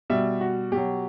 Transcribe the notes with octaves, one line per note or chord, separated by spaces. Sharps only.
B2 G3 E5
F#4
B2 F#3 G4